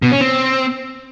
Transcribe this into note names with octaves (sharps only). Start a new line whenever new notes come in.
B2
C#4
C4